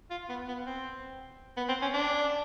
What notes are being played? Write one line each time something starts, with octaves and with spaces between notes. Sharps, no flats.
F4
B3
B3
C4
B3
C4
C#4
D4